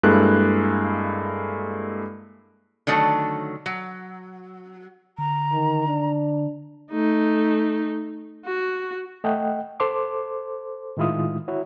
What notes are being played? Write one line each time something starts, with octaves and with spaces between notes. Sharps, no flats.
G2 G#3 A#3 E4 A4 F#6
D3 D#3 F#3 A3
F#3
D3 A#5
D#3
D4
A3 D#4
F#4
A3 D#5 F#5 G5
A4 C5 C6 D6
A2 D#3 G#3 E4 F4 D#6
E4 F#4 C#5